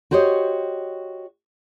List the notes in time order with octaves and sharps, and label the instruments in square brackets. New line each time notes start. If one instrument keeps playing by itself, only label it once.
[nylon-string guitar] F#4 G4 C5 C#5 D#5